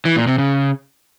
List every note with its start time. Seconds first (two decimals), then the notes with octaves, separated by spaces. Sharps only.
0.05 E3
0.16 A#2
0.27 C3
0.38 C#3